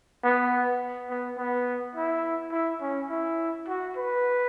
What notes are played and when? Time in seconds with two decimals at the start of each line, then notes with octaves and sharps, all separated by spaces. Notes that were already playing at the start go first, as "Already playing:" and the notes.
0.24 B3
1.10 B3
1.38 B3
1.95 E4
2.52 E4
2.81 C#4
3.10 E4
3.68 F#4
3.97 B4